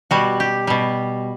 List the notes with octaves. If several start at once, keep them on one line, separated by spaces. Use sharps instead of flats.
B2 G3 F#4
G4
B2 G3